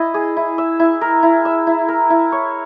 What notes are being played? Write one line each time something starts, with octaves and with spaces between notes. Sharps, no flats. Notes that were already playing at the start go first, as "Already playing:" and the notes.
Already playing: E4 D#5
G#4
E4
E5
E4
A#4
E4
E5
E4
A#4
E4
C#5